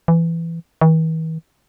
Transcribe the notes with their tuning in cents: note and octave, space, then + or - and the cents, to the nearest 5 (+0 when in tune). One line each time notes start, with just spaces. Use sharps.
E3 +15
E3 -45